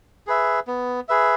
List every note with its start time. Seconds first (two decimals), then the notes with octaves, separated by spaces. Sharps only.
0.27 G#4 B4 E5
0.67 B3
1.09 G#4 B4 E5